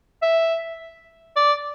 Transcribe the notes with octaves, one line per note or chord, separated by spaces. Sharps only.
E5
D5